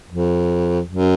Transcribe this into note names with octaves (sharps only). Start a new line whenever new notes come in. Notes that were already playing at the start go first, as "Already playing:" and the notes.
F2
F#2